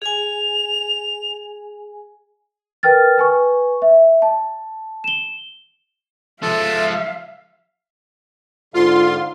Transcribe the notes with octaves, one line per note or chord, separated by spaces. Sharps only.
G#4 G#5 F7
A#4 B4 G5 F6 A6
B4 G#5 C#6
E5
A5
E7 G7
F3 G#3 A4 E5 F5
G#2 D3 F4 F5 C6